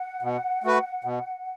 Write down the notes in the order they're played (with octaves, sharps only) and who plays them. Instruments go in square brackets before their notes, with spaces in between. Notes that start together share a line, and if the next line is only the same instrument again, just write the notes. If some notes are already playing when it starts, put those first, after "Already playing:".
Already playing: [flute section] F#5
[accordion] B2
A3 F#4 B4
B2